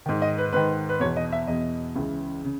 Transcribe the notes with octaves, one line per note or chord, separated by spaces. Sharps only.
G#2 D#3
D#5
B4
G#2 D#3 B4
B4
E2 B2 C#5
D#5
E5
E2 B2 D#5
C#2 C#3 E3
C#3